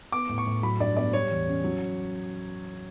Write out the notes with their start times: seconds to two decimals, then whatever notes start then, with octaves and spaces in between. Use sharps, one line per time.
0.12 B3 D6
0.29 A2
0.38 C#6
0.47 A2
0.63 F#3 B5
0.79 G2 D5
0.96 B3 D5
1.13 G3 C#5
1.31 E2
1.47 C#4
1.64 F#3